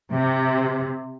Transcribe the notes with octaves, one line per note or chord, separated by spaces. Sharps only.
C3